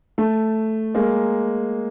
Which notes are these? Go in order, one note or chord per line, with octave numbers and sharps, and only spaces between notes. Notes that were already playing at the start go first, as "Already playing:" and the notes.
A3
G#3 A#3